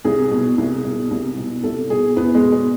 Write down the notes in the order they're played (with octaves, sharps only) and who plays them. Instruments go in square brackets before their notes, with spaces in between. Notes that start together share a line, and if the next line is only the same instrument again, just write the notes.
[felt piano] C2 G#4
B2
C2
B2
C2
B2
C2 A4
B2 G#4
E2 B3
G#3
B2
G#3